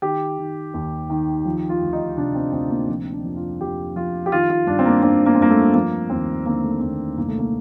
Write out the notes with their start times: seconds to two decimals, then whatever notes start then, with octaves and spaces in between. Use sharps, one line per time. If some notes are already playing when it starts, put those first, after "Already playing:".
0.02 D#3 G4
0.38 D#3
0.74 D#2
1.10 D#3
1.45 F3
1.69 F4
1.81 D2
1.93 D#4
2.17 C3 D4
2.35 C4
2.52 D2 C4
2.70 A#3
2.88 F3 C4
3.13 D4
3.24 F2
3.36 F4
3.60 F2 G4
3.95 F3 F4
4.26 G4
4.32 D#3 F4
4.50 F4
4.67 G2 D4
4.79 C4
4.86 A#3
5.03 G2 C4
5.26 A#3
5.35 C4
5.39 G2 A#3
5.50 A3
5.74 F3 A#3
6.10 D#2 C4
6.46 D3 A#3
6.63 A3
6.81 D#2 A#3
7.18 C2 A#3
7.28 A3
7.39 A#3